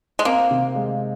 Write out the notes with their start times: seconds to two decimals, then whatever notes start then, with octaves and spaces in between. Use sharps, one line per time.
0.19 G#3
0.25 A#3 C4
0.51 C3
0.76 G#3